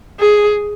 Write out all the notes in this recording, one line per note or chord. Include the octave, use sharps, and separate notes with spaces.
G#4